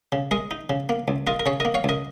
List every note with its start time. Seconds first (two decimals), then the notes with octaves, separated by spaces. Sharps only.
0.12 C#3
0.31 G#3 A#4 D#5
0.51 D#4
0.70 C#3
0.89 A#3
1.08 C#2
1.27 F4 A#4 D#5
1.40 A#4
1.46 C#3 G#4 C#5
1.60 A#3 A#4 D#5
1.74 C#5 F5
1.84 C#2 A#4 D#5